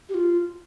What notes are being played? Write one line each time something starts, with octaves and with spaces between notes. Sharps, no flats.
G4
F4